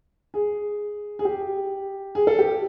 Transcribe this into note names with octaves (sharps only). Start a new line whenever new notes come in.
G#4
G#4
G4
G#4
A4
G4